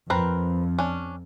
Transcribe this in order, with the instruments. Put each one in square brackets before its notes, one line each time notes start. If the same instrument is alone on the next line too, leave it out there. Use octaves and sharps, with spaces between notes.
[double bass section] F2 [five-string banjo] C4 A#4 B4
[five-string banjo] C#4 D4